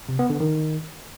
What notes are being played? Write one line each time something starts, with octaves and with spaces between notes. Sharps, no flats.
C3
B3
D3
D#3